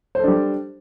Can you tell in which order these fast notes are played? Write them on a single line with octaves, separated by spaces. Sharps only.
C5 A4 D4 G3